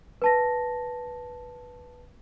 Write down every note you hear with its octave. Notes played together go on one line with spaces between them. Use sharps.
B4 A5 A#6